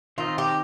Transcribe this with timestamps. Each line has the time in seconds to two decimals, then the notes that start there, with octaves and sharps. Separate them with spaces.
0.18 D#3 C4 D#4 F4 A#4 D#5
0.38 G4